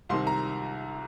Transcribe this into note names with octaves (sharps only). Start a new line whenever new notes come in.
C2 C3 D#3 C6
A#5